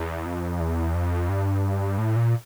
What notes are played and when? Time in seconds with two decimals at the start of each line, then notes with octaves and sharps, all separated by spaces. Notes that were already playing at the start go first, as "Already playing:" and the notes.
Already playing: E2
0.26 F2
0.60 E2
0.95 F2
1.29 G2
1.98 A2
2.16 A#2